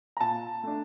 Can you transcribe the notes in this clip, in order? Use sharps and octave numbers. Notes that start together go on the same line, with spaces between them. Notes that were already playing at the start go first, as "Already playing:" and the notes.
A#5
A#2 A5
A3 D4